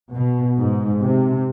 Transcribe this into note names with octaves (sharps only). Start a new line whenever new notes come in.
B2
G#2
C3